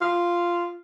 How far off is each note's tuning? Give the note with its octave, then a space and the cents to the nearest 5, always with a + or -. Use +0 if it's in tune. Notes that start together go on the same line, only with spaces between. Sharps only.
F4 -5